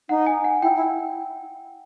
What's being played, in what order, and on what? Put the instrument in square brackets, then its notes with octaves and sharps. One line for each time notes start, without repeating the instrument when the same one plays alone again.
[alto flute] D#4 [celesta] F#5
[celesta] G#5
F#5
[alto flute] E4 [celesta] G5
[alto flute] E4